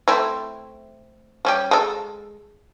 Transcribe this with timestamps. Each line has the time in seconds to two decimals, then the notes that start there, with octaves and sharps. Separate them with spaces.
0.08 A3 C4 E4
1.45 G3 C#4 G4
1.71 G#3 A4